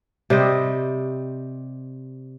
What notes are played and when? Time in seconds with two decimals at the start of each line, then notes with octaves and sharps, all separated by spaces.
0.30 C3 G3 C5 D#5